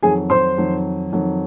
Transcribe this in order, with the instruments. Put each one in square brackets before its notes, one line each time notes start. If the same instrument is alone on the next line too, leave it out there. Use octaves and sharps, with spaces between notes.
[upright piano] F2 D#3 F#3 G#4 G#5
C5 C6
F2 D#3 F#3
F2 D#3 F#3